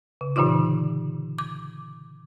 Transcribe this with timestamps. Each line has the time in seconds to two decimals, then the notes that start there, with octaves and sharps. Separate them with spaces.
0.21 C#3
0.36 A#2 D3 E3 D#4 F4
1.38 D6